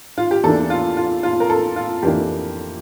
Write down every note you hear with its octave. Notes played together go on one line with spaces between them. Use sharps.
F4
G4
E2 E3 A#3 D4 A4
F4
F4
F4
A#4
A4
F4
F2 E3 A#3 D4 G4